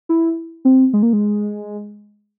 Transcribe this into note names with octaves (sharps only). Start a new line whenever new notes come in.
E4
C4
G#3
A#3
G#3